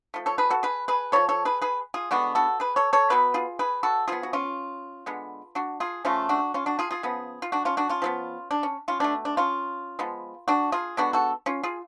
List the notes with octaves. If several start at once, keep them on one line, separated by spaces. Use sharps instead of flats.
F3 A3
A4 C#5
G#4 B4
F#4 A4
G#4 B4
G#4 B4
F3 A3 A4 C#5
A4 C#5
G#4 B4
G#4 B4
F4 G#4
D3 G#3 B3 D4 F#4
F#4 A4
G#4 B4
A4 C#5
A4 C#5
B2 F#3 B3 B4
F4 G#4
G#4 B4
F#4 A4
F3 B3 F4 G#4
F#4
C#4 F4
D3 G#3 B3
D4 F#4
F4 G#4
C#3 F3 A3 C#4 F4
D4 F#4
C#4 F4
D4 F#4
F4 G#4
F4 G#4
C#3 F3 B3
F4
D4 F#4
C#4 F4
D4 F#4
C#4 F4
F3 G#3 B3
D4
C#4
C#4 F4
B2 A3 D4
D4
C#4 F4
F3 G#3 B3
D4 F#4
F4 G#4
D3 G#3 B3 D4 F#4
F#4 A4
C#4 F4
F4 G#4